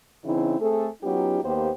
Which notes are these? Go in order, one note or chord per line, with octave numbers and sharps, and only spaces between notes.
C#3 E3 C4 D#4 E4
A3 C4 G#4 A4
F#3 B3 C#4 D#4 F4 G4
D#2 A#3 B3 G4 C5